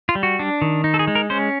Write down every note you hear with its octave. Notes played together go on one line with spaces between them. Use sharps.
F4
G3
F#4
D4
D#3
D#4
A4
G#4
G#3
A#4
C#4 C5